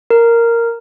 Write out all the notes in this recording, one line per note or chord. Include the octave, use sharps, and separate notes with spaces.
A#4